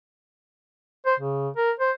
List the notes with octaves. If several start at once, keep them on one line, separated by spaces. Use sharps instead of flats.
C5
C#3
A#4
C5